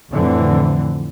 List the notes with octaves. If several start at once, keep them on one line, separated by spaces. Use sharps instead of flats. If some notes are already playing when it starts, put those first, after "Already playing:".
F2 A2 D3 E3 C4